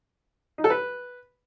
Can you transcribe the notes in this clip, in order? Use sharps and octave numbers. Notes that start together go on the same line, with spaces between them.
D#4
A4
B4